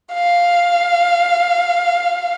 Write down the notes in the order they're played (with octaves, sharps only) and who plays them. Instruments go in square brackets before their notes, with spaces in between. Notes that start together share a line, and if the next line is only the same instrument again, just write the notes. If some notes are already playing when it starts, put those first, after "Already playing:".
[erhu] F5